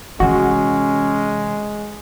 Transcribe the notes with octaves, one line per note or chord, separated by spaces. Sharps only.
C3 E3 G#3 C#4 F#4